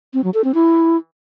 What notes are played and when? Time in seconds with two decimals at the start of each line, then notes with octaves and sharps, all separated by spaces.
0.14 C4
0.24 F#3
0.34 A4
0.44 C4
0.54 E4